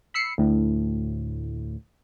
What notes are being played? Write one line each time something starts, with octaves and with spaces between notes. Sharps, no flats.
B5 E6 C7 C#7
D2 A2